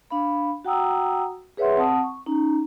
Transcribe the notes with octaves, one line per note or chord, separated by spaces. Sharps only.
D4 F5 B5
F#4 F#5 G5 A#5 D#6 E6
G#4 B4 C#5 E5 F#5 C6
C4 F#5 A5 D#6
C#6
C#4 D#4 A#5